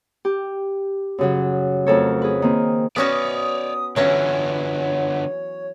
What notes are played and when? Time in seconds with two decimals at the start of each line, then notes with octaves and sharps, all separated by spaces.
0.25 G4
1.18 F#2 C#3 F#3
1.87 F2 F#3 A3 A4 A#4 C#5
2.22 G#4 B4
2.42 D#3 A#3 C4
2.96 B3 C#4 F#4 C#5 D5 D#6
3.96 D3 E3 F#3 B3 C#4 C#5